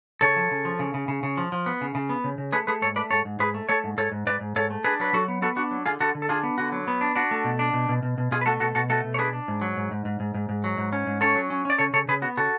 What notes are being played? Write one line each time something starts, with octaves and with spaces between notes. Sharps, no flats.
C#3 A4 C#5
F3
C#3
F3
C#3
C#3
C#3
C#3
F3
F3
B3
C#3
C#3
B3
C#3
C#3
A3 G#4 B4
A3 G#4 B4
G#2 A4 C#5
A3 B4 D5
G#2 A4 C#5
G#2
G#2 G#4 B4
A3
A3 A4 C#5
G#2
G#2 A4 C#5
G#2
G#2 B4 D5
G#2
G#2 A4 C#5
A3
D4 G#4 B4
F#3 B4
F#3 F#4 A4
B3
B3 F#4 A4
D4 F#4
F#3
D3 F4 G#4
D3 F#4 A4
D3
A4
D4 F4 G#4
B3
D3 F#4
F#3
B3
D4
D4 F#4
A3
B2
D4
B2
B2
B2
B2
B2 F4 G#4
B4
A3 F#4 A4
B2 F#4 A4
B2 F#4 A4
A3 F#4 A4
B2
C#5
D4 G#4 B4
D4
G#2
F#3
G#2
G#2
G#2
G#2
G#2
G#2
F#3
G#2
C#4
G#2
C#4 A4 C#5
F#3
C#4
C#4 D5
C#3 A4 C#5
C#3 A4 C#5
C#3 G#4 B4
B3 F#4
C#3 F#4 A4